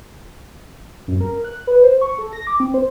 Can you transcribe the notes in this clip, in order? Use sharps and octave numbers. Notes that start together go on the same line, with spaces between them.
F#2
A#4
F#6
B4
C5
C#6
A4
A#6
D6
C4
C5